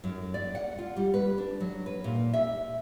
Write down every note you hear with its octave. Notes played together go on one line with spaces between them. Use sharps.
F#2
D5
F#5
F4
G3
B4
D4
F#3
B4
A#2
E5